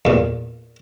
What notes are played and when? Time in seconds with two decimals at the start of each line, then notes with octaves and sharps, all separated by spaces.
0.05 E2 A#2